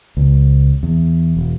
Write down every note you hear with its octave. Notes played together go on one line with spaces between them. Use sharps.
C#2
E2
E1